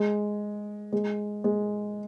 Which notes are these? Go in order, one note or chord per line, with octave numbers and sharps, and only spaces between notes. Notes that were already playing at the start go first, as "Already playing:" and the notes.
Already playing: G#3
G#3
G#3